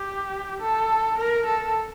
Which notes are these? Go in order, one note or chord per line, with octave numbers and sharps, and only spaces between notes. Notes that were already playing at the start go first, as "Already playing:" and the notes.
Already playing: G4
A4
A#4
A4